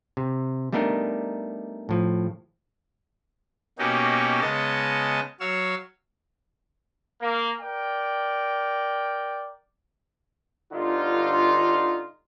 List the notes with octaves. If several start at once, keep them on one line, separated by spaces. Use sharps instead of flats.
C3
G3 A3 B3 D4 D#4 A#4
A2 F3
B2 A#3 C#4 D#4 F#4 G4
C#3 G#3 B3 D#5 A5
F#3 C#5 F5 E6
A#3
A#4 D5 G5
G1 D3 D#4 F4